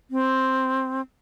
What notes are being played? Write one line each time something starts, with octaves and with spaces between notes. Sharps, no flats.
C4